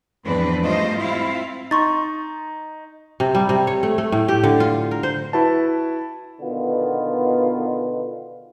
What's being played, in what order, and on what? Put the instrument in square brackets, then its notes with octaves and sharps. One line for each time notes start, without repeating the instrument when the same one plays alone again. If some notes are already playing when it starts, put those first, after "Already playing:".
[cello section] E2 G#2 F3 C4 D4 B4
G#2 G3 A3 F4 C5 D#5
C4 E4 F4 F5
[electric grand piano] D#4 [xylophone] C6 C#6 A6
[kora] C3
G3
C3
C#5
A3
A3
A2
G4
D3
F4
A#4
C5
[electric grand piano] E4 F#4 B4 A5
[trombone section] B2 D3 D#3 B3 F4